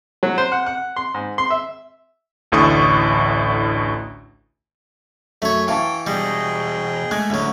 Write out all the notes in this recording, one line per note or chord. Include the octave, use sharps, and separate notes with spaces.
F#3
C5
F#5
F#5
C6
G#2
C6
E5
A1 D2 A2 D4 C#6 D#6
F#2 A3 C#5 E5
E3 F5 G5 A5 C#6
E2 B2 G3 G#4 D#5 G5
G#3 A3 G#6
D2 A2 F#3 C#4